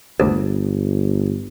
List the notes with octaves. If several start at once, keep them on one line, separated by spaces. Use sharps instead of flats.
G1 D2